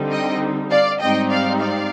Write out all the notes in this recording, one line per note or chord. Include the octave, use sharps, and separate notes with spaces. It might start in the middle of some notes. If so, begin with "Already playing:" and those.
Already playing: D3 G3 C4 D#4
D#5 G5
D5 F5
G#2 G3 C4 D#4 D#5 G5
D5 F5
D5 F5